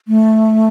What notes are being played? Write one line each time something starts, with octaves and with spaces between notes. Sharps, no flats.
A3